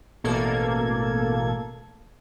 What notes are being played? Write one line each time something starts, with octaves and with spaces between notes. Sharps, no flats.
A1 B2 A#3 A4 G#6